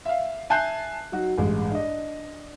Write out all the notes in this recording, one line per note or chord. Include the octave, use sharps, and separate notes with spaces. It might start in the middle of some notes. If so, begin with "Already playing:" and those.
E5 F5
E5 G#5 A5 F#6 G6 C7
F#3 D#4 F#4
A1 G2 G#3
D4 D#5